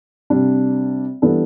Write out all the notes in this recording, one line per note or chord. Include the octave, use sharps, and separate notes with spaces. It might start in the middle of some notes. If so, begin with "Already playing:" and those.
C3 G3 D4
E3 G3 B3 D4 A4